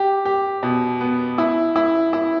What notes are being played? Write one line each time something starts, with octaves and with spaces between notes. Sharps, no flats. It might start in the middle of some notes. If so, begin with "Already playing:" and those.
Already playing: G4
G4
B2
B3
E4
E4
E4